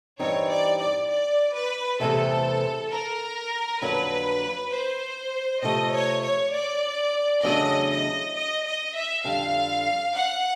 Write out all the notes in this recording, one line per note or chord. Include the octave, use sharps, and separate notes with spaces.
G2 E3 G3 C4 D#4 C#5
D5
D5
D5
B4
E2 C3 E3 A3 C4 A4
A#4
F2 D3 F#3 A#3 B4
C5
C3 F3 A3 D#5
C#5
C#5
D5
E2 C#3 F#3 A3 D4 D#5
D#5
D#5
D#5
E5
F2 D3 G3 F5
F#5